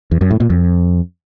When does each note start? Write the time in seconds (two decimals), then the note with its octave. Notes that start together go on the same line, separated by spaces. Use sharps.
0.11 E2
0.21 F#2
0.31 A2
0.40 A#2
0.50 F2